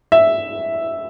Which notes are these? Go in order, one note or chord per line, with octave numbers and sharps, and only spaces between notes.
E5